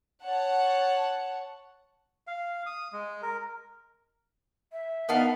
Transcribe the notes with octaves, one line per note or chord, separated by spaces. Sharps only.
C#5 F#5 A5
F5
D#6
G#3
A#4
E5
D#3 B3 D4 F5